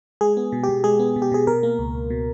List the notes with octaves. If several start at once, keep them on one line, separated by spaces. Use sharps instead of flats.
G#3 G#4
B3
B2
B2 G4
G#3 G#4
B3
B2
G4
B2 G#4
B2 A#4
A#3
C#2
C#2
B2